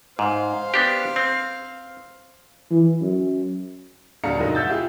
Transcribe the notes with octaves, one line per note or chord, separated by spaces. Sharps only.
G#2 C5 F5
B3 D4 G4
C4
E3
F#2
D#1 D3 G3 F5 A#5 C#7
F1 G#2 F#3 D#4 A#4
E5 F#5 E6 G6 A6
E4 F4 G4 G#4